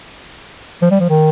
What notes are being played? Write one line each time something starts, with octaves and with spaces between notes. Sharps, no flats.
F3
G3
F3
D#3